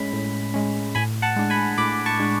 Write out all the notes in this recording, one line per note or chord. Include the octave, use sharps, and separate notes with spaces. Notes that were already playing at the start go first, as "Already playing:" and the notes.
Already playing: A2 G#3 C#4 B5
A2
G#3 C#4
A2 G#5 B5
F#5 A5
G#3 D4
G#5 B5
A2 B5 D6
A5 C#6
G#3 D4